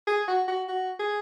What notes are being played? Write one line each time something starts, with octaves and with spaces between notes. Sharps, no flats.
G#4
F#4
F#4
F#4
G#4